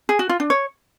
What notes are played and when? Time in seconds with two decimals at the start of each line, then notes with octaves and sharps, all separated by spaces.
0.09 G#4
0.19 F#4
0.29 F4
0.40 D4
0.50 C#5